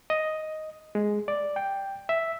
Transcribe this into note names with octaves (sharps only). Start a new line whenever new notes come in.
D#5
G#3
D5
G5
E5